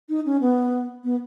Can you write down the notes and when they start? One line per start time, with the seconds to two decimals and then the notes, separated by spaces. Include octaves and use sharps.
0.09 D#4
0.26 C#4
0.41 B3
1.04 B3